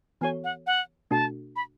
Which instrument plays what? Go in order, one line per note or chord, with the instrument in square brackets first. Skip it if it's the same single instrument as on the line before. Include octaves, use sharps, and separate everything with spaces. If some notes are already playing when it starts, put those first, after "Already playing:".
[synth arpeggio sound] E3 B3 F#4 A4 C#5 [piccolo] G#5
[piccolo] F#5
F#5
[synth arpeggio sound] B2 A3 D4 F#4 A4 [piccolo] A5
[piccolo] B5